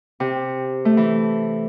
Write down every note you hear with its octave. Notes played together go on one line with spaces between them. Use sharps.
C3
A3
E3